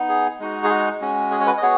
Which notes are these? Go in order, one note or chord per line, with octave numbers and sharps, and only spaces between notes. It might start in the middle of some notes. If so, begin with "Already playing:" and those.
Already playing: B3 D#4
G#4
G#3 D#4 F#4
G#4
F#4
G#3 C#4 F#4
G#4
C#5
F#4 B4
D#5
B3 F#4 G#4 C#5